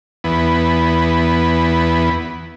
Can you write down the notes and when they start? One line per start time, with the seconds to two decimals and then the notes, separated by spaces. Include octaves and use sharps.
0.24 E2 B3